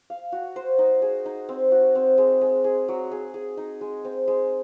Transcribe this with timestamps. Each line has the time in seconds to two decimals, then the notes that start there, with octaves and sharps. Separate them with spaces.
0.10 F5
0.32 F#4
0.56 C5
0.78 D#4
1.02 G#4
1.26 D#4
1.49 C4
1.72 F#4
1.95 C4
2.18 G#3
2.41 G#3
2.64 G#4
2.88 F#3
3.11 G#4
3.34 G#4
3.57 D#4
3.81 G#3
4.05 C4
4.28 G#3